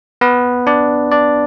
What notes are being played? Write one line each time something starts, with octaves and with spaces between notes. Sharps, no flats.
B3 B4
D4 D5
D4 D5